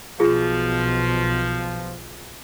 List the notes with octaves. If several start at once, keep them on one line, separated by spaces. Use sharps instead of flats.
B1 B2 F3 F4 G#4